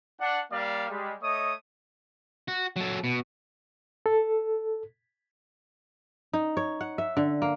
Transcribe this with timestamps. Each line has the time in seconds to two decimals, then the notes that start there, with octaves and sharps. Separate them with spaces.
0.19 D4 F#5
0.51 G3 A#3 D5 F5
0.88 G3 G#3
1.22 A3 C#5 D#5 D#6
2.48 F#4
2.76 F#3 A4
3.04 B2
4.06 A4
6.33 D#4
6.57 C#5
6.81 F#5
6.98 E5
7.17 D3
7.42 A#3